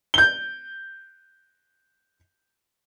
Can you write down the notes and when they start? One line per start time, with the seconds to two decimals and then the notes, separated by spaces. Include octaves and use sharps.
0.14 G6 G7